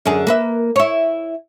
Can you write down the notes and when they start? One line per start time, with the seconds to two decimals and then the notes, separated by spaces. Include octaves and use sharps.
0.05 F#2 D3 G#4
0.27 A#3 B4 E5
0.76 E4 C#5